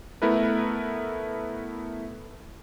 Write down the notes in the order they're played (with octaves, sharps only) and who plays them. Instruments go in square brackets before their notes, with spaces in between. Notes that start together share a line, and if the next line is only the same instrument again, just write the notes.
[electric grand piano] A3 B3 E4 A#4 B4